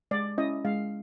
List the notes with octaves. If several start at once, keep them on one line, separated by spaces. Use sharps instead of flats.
G#3 D5
C#4 E4 D#5
G#3 F5